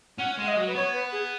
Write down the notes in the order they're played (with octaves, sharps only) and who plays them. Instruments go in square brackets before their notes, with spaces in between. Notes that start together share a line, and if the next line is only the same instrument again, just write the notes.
[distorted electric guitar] C#4 [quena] F#5
[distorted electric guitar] G#3 [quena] F#5
[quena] D#5
[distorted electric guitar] F#3
[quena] B4
[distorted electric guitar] B3 [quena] C#5
[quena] B4
G#4